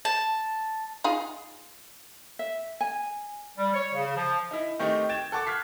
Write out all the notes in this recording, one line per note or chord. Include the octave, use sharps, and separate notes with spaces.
A5
D#4 F4 G#4
E5
G#5
G3
C#5
C#3
F3
D#4 E4
D#3 A3 C4 D#4 G4
G5 G#6 A6 E7
A4 F#5 C#6 D6 A6
F6 F#6 G#6 A6 B6 C7